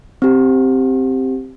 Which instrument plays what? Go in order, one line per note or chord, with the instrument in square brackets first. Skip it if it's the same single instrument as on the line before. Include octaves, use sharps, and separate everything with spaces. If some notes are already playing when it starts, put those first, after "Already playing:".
[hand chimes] C4 G4